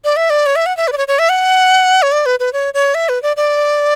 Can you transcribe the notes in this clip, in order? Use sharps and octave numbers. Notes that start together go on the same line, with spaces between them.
D5
E5
D5
C#5
E5
F#5
E5
B4
D5
C#5
C#5
E5
F#5
C#5
D5
B4
B4
C#5
C#5
E5
B4
D5
D5